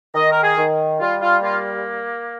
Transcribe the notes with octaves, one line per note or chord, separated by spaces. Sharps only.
D#3 D#5
A#4
G#4
D#3
G3 F4
F4
A#3 F4